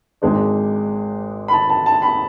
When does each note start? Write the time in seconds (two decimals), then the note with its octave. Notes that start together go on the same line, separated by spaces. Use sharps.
0.22 G#1 G#2 G#3 D4
1.48 B5
1.53 A5
1.69 A5
1.86 A5
2.02 B5